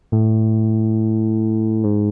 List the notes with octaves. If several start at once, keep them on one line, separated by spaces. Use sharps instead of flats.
A2
G#2